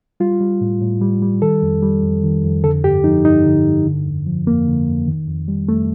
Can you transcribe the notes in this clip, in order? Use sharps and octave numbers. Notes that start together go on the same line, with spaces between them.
G3 F4
G3
A2
A2
G3
G3
D#3 A4
F2
G3
F2
D#3
F2
D3 A4
G2 G4
F3 D#4
G2 D#4
D3
G2
D3
F2
F3
F2 A#3
D3
F2
D#3
F2
G3
F2 A3